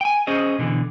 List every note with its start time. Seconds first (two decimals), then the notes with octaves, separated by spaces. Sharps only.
0.01 G5 G#5
0.27 C#4 G#4 C5 D#5
0.59 B2 D3 E3